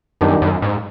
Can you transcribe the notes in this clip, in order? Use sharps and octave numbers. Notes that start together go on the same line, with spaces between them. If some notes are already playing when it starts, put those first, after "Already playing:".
F#2 D#3 G3 B3 D4 G4
F#2
G#2